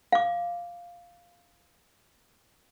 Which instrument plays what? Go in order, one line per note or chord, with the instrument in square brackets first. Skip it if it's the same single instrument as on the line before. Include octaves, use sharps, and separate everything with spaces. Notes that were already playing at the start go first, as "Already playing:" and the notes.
[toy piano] F5 D6